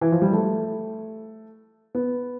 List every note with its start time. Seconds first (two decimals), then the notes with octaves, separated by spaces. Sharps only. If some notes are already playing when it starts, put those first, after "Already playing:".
0.01 E3
0.12 F3
0.22 G3
0.33 A3
1.95 B3